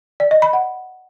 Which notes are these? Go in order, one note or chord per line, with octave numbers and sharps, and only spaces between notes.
D5
D#5
B5
F#5